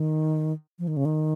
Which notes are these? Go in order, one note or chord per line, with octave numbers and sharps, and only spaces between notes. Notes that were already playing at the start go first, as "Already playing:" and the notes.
Already playing: D#3
F3
D#3
C#3
D#3